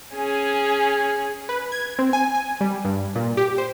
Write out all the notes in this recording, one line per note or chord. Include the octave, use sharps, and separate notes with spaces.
C#4 G#4
B4
G#6
C4
G#5
G#5
G3
G2
A#2
G4
C5